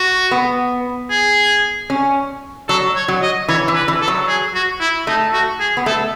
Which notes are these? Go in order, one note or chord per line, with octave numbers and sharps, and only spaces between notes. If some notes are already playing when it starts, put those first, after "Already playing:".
Already playing: F#4
B3
G#4
C#4
F#3 A4
C#5
F#3
D#5
E3 C#5
E3
B4
E3
A4
F#3
G#4
F#4
E4
A3 D#4
F#4
G#4
B3
A3 A4